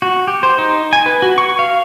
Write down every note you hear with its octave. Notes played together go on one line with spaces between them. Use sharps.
F#4
G4
C5
D#4
G#5
B4
F#4
C#6
F5